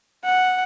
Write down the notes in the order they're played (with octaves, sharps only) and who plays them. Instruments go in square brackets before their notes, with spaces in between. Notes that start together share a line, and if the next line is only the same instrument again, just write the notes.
[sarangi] F#5